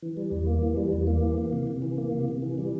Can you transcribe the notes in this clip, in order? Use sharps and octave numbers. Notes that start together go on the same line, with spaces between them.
E3
G3
E2
A#3
E3
G3
E2
A#3
E3
A#3
C3
C3
E3
A#3
C3
C3
E3
G3